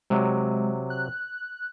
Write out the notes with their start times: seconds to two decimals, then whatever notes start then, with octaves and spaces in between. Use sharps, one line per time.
0.10 C3 F#3 G#3
0.90 F#6